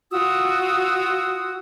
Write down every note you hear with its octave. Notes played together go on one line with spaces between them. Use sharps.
F4 F#4 D#6 E6